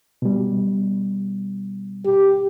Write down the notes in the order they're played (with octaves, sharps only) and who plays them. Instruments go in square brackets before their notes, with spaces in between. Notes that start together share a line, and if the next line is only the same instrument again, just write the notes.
[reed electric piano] B2 G3
[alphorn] G4